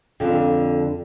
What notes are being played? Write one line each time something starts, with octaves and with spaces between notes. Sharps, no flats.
F2 D3